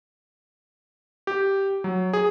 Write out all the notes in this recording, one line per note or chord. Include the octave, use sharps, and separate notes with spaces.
G4
F#3
G#4